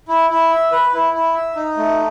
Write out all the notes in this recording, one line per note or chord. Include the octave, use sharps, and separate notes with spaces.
E4
E4
E5
B4
E4
E4
E5
D#4
A3